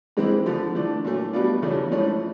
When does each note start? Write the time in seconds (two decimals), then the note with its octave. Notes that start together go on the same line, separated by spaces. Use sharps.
0.17 G#2 E3 G#3 C4 E4
0.46 D3 F3 A3
0.75 E3 A3 D4
1.05 A#2 F#3 A3
1.33 B2 G3 B3 D4 F4
1.62 E2 C#3 E3 A3 D4
1.91 G#2 F3 A3 C#4 E4